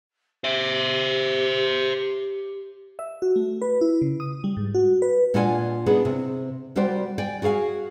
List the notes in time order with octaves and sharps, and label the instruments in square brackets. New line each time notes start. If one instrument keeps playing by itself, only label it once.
[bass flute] G4 [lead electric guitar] C5 E5
[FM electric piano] E5
F#4
A3
B4
E4
C#3
D#6
G3
G#2
F#4
B4
[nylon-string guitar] A#2 D4 F4 D#5 F#5 G#5
B3 D4 D#4 G#4
C3
G3 F#4 G4 A#4 C5 D5
D5 G5 G#5
F#4 G#4 A#4 F5 G#5